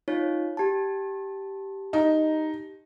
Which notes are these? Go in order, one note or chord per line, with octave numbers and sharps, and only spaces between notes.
D#4 F4 C#5
G4 A5
D#4